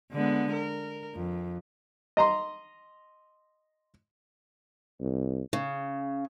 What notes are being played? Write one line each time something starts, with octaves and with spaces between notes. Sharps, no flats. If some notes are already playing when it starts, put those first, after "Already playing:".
D3 G#3 B3
A#4
F2
D#5 A#5 C6
C2
C#3